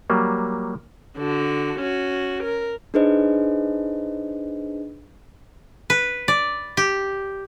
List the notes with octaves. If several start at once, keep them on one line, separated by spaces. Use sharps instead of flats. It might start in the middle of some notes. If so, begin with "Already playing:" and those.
F#3 G3 A#3
D3 F#4
C#4 F#4
A#4
D4 D#4 G#4 B4 C5 D#5
B4
D5
G4